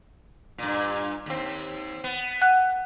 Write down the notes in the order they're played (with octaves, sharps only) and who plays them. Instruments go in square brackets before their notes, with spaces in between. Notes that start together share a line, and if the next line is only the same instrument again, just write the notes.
[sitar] G2 A#2
D#2 C4
B3
[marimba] F#5 F#6